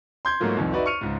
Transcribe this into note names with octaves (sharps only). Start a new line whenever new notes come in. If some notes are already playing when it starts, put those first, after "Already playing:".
C6 G6 G#6
G#2 F#3 A3 A#3 F4
C2 F2 D#3
D#4 F#4 B4 D5 E5
C#6 F6 C#7 D#7 F7
C#2 G#2